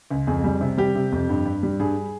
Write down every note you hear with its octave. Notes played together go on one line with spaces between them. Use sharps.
C#2
F2 G#4
G3
C3
G3 G4
C3
F2
G2
G2
G3
G2 G#4